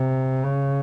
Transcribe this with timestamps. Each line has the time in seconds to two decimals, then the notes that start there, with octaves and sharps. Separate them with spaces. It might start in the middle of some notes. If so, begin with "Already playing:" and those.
Already playing: C3
0.44 C#3